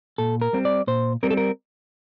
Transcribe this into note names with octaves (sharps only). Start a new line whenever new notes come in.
A#2 A4
A#4
G3 C4
D5
A#2 C5
G3 C4 A#4
A4
A#4